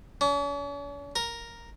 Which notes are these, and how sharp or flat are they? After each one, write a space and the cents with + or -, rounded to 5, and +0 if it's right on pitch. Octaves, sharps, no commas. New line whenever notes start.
C#4 +45
A#4 +0